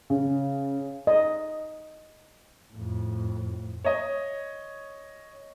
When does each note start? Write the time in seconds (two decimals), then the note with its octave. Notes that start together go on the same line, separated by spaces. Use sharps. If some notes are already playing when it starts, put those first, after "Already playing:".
0.10 C#3
1.07 D#5
2.72 F2 A2
3.85 C#5 D#5